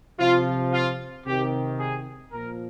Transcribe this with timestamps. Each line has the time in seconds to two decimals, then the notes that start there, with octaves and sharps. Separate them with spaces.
0.19 C3 F3 F4
0.72 F4
1.26 C3 D#3 G4
1.79 G#4
2.32 A#2 F3 A#4